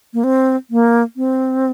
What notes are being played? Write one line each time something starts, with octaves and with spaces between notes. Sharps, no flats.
A#3
C4
A#3
C4